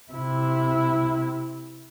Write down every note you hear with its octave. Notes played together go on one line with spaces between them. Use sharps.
C3 E4